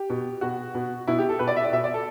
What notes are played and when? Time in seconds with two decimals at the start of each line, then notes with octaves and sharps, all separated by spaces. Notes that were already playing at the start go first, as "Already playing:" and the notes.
Already playing: G4
0.10 B2
0.41 B2 F#4
0.75 B2
1.07 B2 E4
1.19 G4
1.29 A4
1.39 B2 B4
1.48 D5
1.56 E5
1.64 D5
1.72 B2 E5
1.84 D5
1.94 A4